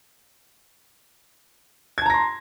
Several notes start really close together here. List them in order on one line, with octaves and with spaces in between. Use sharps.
G#6 A5 A#5 A#6 C6